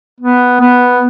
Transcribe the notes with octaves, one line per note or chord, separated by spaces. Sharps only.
B3
B3